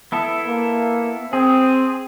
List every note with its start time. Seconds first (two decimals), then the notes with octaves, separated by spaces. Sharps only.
0.12 B3 E4 A4
0.46 A#3
1.33 C4 G#4